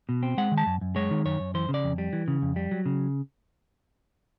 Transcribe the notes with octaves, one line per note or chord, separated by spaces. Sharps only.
B2
C4
G#3 F#5
D#3
A5
F#2
F#2
G#3 C#5
D#3
F#2 C#5
F#2
E3 C5
C#3
D5
F2
G3
E3
C#3
F2
G3
F#3
C#3